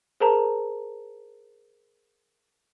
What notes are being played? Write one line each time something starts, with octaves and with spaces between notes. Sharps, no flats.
G#4 A#4 C5 A5 A#5